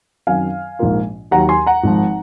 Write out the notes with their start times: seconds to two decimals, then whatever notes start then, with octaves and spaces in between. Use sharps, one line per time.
0.27 F#2 D#3 F#3 C4 F5 G#5
0.79 A#1 G#2 F3 A#3 F4
1.31 D#2 D#3 F#3 F#5 A#5
1.49 G#5 C6
1.66 F#5 A#5
1.83 G#1 G#2 F3